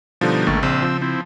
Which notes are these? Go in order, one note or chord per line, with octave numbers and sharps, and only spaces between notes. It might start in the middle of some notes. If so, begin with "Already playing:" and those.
B2 D3 F3 G3 D#4
G#1 C#2 D3 A3 A#3 C#6 A6
A#1 C#3 C4 E6
F3
C4 E4